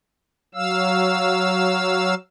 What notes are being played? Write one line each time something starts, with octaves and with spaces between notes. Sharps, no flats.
F#3 F5 E6